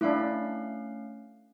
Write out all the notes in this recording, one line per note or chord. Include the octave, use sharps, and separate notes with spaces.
A3 C#4 D4 E4 F5